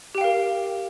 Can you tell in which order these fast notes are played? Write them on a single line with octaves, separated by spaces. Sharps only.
G4 G5 F5 A#4